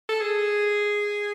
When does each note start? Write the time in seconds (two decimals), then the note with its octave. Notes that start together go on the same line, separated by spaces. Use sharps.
0.09 A4
0.21 G#4